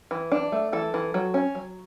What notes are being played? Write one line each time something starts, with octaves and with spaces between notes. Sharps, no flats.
E3
D4
A3
E3 A4
E3
F#3
C#4
F#3